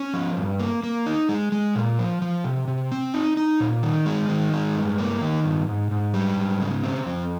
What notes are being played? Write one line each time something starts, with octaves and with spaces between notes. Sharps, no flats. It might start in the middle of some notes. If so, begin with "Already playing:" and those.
Already playing: C#4
F3
G2
A#3
A#3
D#4
G#3
G#3
A#2
F3
F3
C3
C3
C4
D#4
D#4
A#2
D#3
G#3
D#3
G#3
G2
A#3
D#3
G2
G#2
G#2
G3
G#2
C#3
C4
F2